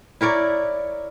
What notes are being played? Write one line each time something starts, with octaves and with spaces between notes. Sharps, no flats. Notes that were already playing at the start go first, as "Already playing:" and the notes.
E4 A#4 C#5 D5